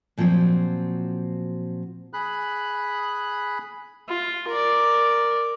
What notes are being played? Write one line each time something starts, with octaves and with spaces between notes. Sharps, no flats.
A#2 F3 F#3 C4 F#4
G#4 B5 F#6
F4
A#4 D5